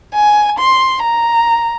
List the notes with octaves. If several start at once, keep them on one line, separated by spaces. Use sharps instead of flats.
G#5
C6
A#5